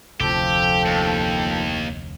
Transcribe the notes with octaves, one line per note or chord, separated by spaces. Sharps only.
F1 D2 F3 G4 A4 G5
D#2